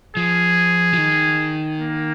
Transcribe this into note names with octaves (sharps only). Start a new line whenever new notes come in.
F3 G#4
F3
D#3
A#3